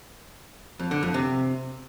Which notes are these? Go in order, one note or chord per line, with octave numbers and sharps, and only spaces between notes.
F2
D3
F2
C3